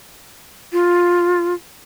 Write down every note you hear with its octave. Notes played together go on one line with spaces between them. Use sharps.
F4